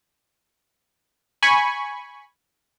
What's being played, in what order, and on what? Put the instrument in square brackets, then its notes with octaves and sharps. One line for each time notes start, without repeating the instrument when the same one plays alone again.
[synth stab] G#5 B5 C#6